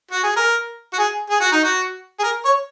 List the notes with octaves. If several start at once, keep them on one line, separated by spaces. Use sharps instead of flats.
F#4
G#4
A#4
F#4
G#4
G#4
F#4
D#4
F#4
G#4
A#4
C#5